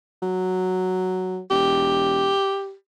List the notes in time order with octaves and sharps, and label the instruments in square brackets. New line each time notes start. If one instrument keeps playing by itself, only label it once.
[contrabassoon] F#3
[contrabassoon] E1 [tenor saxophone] G4